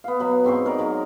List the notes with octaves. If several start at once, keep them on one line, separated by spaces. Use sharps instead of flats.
B3 F5
B2 F#3 B5
G#2 C4 C6 C#6
D#4 A#4 C#5 D5
F#3 G#3 F#4